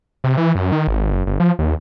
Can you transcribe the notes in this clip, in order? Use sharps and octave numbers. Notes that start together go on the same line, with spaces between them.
C3
E3
F#2
D#3
G#1
F#1
G1
F3
D#2